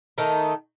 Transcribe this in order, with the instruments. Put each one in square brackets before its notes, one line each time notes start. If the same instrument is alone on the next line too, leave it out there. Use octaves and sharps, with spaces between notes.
[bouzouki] D#3 A3 D#4